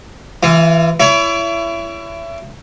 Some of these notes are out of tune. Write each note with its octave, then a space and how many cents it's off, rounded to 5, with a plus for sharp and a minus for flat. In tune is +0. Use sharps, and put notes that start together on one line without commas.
E3 +0 F4 -40
E4 +25 C#5 +30